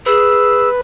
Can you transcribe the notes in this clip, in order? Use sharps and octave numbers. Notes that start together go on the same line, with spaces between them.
G#4 B4 E6